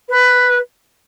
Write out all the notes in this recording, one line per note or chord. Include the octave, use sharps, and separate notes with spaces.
B4